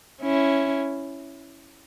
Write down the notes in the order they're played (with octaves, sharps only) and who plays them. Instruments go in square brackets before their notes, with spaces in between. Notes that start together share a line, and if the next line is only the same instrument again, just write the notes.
[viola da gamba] C#4 E4